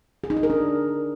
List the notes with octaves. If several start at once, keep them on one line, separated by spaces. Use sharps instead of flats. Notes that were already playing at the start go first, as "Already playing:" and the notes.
G#4
D#4
G#4
A#4
D4